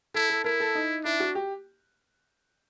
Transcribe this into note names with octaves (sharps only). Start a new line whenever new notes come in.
E4 A4
A4
E4 A#4
A4
D#4
D4 E4
F#4
G4